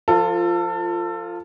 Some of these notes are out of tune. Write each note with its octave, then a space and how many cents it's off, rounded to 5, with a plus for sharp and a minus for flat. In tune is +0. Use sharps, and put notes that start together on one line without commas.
F3 -10 F4 +0 A4 +25